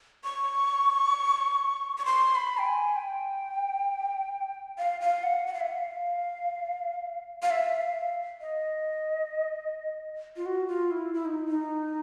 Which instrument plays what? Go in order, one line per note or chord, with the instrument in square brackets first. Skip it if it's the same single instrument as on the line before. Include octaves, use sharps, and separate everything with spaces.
[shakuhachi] C#6
C#6
C6
B5
G5
G#5
G5
F5
F5
F#5
F#5
F5
E5
F5
F5
E5
F5
D#5
F4
F#4
F4
E4
E4
D#4
D#4